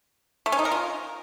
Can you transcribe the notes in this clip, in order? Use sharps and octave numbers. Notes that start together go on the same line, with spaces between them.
A3
C#4
D#4
A#4
F4